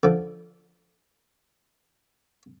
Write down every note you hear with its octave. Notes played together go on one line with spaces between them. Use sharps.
D3 F3